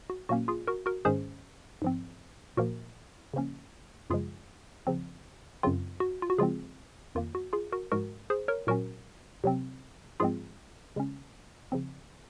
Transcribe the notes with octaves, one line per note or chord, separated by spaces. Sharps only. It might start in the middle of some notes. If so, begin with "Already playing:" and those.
F#4
A#2 F#3 A#3 C#4 F#4
F4 G#4
F#4 A#4
F#4 A#4
G#2 D#3 G#3 C#4 G#4 C5
G#2 F3 C4
A#2 F3 A#3 F#4 A#4
C#3 F3 A#3 C#4
F#2 C#3 F3 G#3 F4 G#4
C#3 F3 C4
F#2 C#3 F#3 C4 F4
F#4
F4
F#4
C#3 F3 G#3 C4 F4 G#4
F2 D#3 A#3 F4
F#4
F4 G#4
F#4 A#4
G#2 F3 G#3 F#4 A#4
G#4 C5
A#4 C#5
A#2 F#3 C#4 F#4 A#4
C3 F#3 C4
G#2 F3 G#3 C4 F4 G#4
C#3 G#3 C#4
C#3 F3 C4